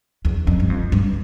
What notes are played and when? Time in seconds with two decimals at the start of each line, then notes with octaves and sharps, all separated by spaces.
0.25 E2
0.47 F2
0.60 G2
0.70 F2
0.92 G2